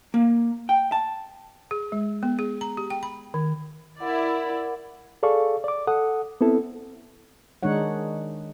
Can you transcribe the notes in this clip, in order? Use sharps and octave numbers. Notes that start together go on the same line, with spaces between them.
A#3
G5
A5
G#4
G#3
B3
G#4
A#5
G4
G5
B5
D#3
E4 A#4 D5 F#5
G#4 A4 D5 F5 C#6
D5 D6
A4 F#5 D#6
B3 C4 E4 A4
D#3 G#3 D4 D#4 C#5 F#5